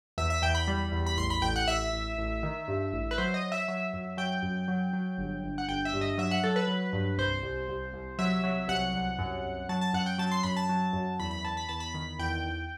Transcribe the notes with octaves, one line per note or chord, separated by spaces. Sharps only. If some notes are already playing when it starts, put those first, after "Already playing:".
E2 E5
E5
E2 G5
B5
G3
E2
B5
A1 C6
B5
A1 G5
F#5
A1 E5
A1
A1
D#3
G2
A1
B4
F#3 C5
D#5
F#3
E5
F#3 E5
F#2
F#3 G5
F#2
F#3
F#3
G1
G1
F#5
G1 G5
E5
G2
D#5
F#3 E5
F#5
F#3 A4
B4
F#3
G2
C2 C5
C2
C2
C2
F#3 E5
F#3
C2 F#5
C2
F#2
F#2
F#3 A5
A5
F#2 F#5
G5
F#3 A5
C6
F#2 B5
A5
F#3
F#2
E2 B5
B5
E2 A5
B5
E2 A5
B5
D#3
E2 G5
E2